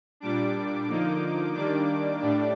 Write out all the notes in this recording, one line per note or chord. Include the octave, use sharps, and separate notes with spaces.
A#2 G3 D4 D6
D3 F3 A#3 D#4
D#3 G3 A#3 D4 D6
A2 G3 D4